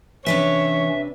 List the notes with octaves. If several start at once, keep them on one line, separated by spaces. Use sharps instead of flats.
C3 E3 C#4 D4 B4 C#5 E5